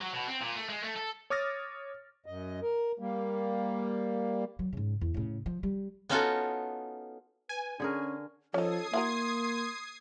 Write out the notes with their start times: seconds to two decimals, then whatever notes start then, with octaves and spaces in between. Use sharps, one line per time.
0.01 F#3
0.13 B2
0.28 C4
0.41 A#2
0.56 A3
0.69 G#3
0.83 A3
0.96 A4
1.30 C#5 D6 D#6 F6 A6 A#6
2.26 F#2 D#5
2.62 A#4
2.99 G3 A#3
4.59 F#3
4.73 G#2 C#3
5.01 E2
5.14 A2 C#3
5.46 F3
5.63 G3
6.09 B3 C#4 D#4 F4 F#4 A4
7.49 B4 G#5
7.80 D3 C#4 G#4 A#4
8.54 F3 C#4 D#4 A4 D#6 G#6 C7
8.94 A#3 E4 F#4 A#4 C6